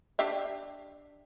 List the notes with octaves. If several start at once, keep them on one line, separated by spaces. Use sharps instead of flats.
D4 G4 E5